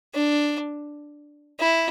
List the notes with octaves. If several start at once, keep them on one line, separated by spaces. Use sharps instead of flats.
D4
E4